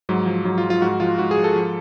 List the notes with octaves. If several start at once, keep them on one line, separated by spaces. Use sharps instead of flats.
G#2 F#3
F3
G#2 F#3
F4
F3
F4
G#2 F#4
F3 F4
G#2 F#4
G#4
F3
A4
F3